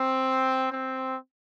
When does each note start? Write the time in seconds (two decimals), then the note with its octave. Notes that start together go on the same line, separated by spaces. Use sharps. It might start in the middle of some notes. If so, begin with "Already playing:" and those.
Already playing: C4
0.71 C4